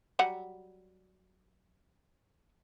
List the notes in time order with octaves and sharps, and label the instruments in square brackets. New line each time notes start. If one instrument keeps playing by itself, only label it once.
[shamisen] F#3 G3 F#5